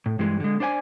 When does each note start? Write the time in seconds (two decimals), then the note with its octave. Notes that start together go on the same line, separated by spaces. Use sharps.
0.06 A2
0.19 G2 E3 G#3
0.40 D3 G#3
0.60 D4 C5 D5 G5 G#5